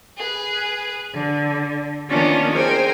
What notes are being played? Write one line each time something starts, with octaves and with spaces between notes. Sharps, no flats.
G#4 B4
D3
D#3 A#3 B3 C#4 D4 F4
G#4 A#4 C5 G5 G#5